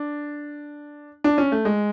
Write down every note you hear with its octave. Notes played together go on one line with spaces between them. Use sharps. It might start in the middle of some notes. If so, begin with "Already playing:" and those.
Already playing: D4
D4
C#4
A3
G#3